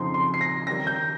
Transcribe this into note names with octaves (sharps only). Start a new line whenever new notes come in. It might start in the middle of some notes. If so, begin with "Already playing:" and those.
Already playing: F2 C#3 F3 C4 D#4 C6
C6
C7
A#6
D#3 G3 C#4 A#6
G6